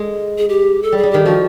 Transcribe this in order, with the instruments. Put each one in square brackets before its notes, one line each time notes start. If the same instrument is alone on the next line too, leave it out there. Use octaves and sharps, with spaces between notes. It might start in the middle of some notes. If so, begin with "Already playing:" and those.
Already playing: [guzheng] G#3
[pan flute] G#4
G4
A4
[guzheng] G3 [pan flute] G#4
[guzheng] G3
[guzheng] D#3 [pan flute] G4
[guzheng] F3 [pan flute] F#4